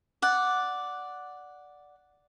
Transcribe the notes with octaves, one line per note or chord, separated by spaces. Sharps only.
D5 F#5